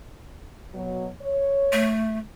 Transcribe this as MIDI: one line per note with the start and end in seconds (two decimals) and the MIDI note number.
0.74 1.09 47
0.74 1.09 54
1.22 1.91 73
1.73 2.18 57